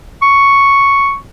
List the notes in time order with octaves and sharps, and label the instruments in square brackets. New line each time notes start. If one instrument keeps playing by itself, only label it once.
[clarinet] C#6